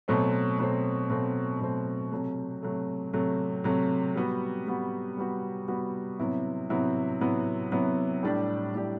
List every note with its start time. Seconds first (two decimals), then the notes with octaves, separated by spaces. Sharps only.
0.08 B2 F#3 A3 C4
0.58 B2 F#3 A3 C4
1.10 B2 F#3 A3 C4
1.60 B2 F#3 A3 C4
2.12 C3 F#3 A3
2.63 C3 F#3 A3
3.13 C3 F#3 A3
3.64 C3 F#3 A3
4.15 G3 B3 F#4
4.67 G3 B3 F#4
5.18 G3 B3 F#4
5.68 G3 B3 F#4
6.20 C3 F#3 B3 E4
6.70 C3 F#3 B3 E4
7.21 C3 F#3 B3 E4
7.72 C3 F#3 B3 E4
8.23 A2 G3 D4 G4 D5
8.74 A2 G3 D4 G4 D5